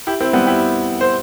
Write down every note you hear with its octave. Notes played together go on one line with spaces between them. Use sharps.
E4 G4
C4 E4
G3 B3
E4 G4
C5